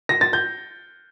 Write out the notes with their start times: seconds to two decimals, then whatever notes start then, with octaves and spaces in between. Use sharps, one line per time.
0.09 A#6
0.21 A6
0.33 G6